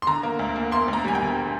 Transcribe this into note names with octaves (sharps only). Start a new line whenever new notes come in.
C6
D3 A#5
A#3
D2
A#3
A#3 C6
D2
A#5
G3 G#5
G5
D3